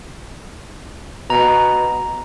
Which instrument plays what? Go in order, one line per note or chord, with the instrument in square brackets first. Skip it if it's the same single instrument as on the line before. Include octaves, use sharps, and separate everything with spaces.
[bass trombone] B2 [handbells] A#5